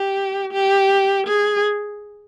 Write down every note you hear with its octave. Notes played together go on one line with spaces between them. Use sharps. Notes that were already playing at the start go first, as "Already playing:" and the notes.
Already playing: G4
G4
G#4